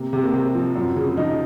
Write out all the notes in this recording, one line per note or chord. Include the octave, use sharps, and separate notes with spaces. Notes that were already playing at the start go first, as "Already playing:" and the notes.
Already playing: C3 A#3
C3
A#3
C3 C4
F3
F#2
C#3
F3 D#4